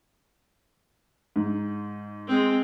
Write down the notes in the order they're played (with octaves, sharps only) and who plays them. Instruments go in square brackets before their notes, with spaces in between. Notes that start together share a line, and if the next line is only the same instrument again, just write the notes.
[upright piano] G#2
[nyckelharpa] G#3 C4